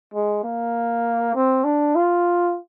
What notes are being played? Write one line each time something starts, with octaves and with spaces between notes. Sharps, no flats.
G#3
A#3
C4
D4
F4